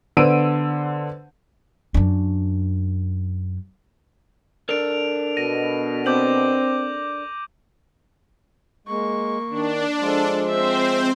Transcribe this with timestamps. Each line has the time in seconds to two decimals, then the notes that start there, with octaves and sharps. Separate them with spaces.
0.17 D3 B3 C5 E6 D7 D#7
1.94 F#2 D4
4.69 D4 A4 A#4 D7 F7
5.37 B2 A#6 D#7
6.06 C4 D6 G6 F#7
8.87 G#3 A#3 C#6
9.50 D#3 D4
10.00 F3 G#3 F4 A4
10.48 C4 C5 E5